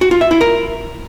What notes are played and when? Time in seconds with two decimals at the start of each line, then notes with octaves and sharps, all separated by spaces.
0.01 F#4
0.11 F4
0.21 E5
0.31 E4
0.41 A#4